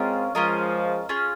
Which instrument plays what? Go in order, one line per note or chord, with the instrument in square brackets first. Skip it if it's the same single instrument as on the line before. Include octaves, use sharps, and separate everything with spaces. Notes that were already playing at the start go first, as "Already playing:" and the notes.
Already playing: [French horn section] G#3 C4 [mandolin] C#4 F4 A#4 D#5
[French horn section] F3 G#3 [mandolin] C#4 F4 A#4 D#5
[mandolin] C#4 F4 G#4